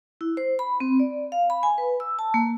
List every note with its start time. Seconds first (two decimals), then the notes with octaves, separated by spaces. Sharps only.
0.21 E4
0.37 C5
0.59 B5
0.80 C4
1.00 D5
1.32 F5
1.50 B5
1.63 G#5
1.78 B4
2.00 E6
2.19 A5
2.34 A#3